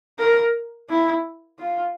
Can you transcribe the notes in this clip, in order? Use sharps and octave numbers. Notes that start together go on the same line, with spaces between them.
A#4
E4
F4